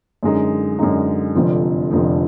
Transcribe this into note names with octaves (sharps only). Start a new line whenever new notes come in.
F#2 D3 G#3 D#4
F#2 D3 G#3 D#4
F1 F2 D3 F3
F1 F2 D3 F3